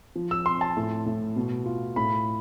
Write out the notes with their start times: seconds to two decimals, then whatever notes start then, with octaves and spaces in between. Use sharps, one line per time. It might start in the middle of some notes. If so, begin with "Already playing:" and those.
0.16 F3
0.31 E6
0.46 C4 C6
0.61 A5
0.77 A2
1.06 A2
1.36 B2
1.66 F4
1.96 A2 B5